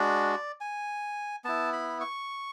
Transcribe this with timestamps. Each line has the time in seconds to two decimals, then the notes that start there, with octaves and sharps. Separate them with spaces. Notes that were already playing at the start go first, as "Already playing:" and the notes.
Already playing: G#3 D4 F#4 D5
0.61 G#5
1.44 B3 E4 A5
1.73 B5
2.00 C#6